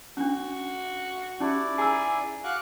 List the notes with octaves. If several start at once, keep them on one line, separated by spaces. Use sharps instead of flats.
C#4 D4 F#4
C#4 D#4 E4 G4 D5
G#4 G#5 A#5 E6
F#4 F5 D6 F#6